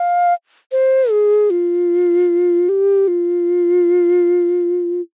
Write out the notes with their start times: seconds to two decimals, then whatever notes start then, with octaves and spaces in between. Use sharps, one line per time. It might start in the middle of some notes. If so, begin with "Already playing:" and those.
Already playing: F5
0.72 C5
1.11 G#4
1.50 F4
2.69 G4
3.08 F4